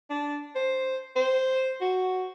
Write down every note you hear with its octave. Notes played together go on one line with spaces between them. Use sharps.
D4
C5
C5
F#4